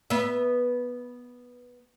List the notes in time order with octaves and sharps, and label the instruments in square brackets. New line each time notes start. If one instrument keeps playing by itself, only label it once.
[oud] B3 E5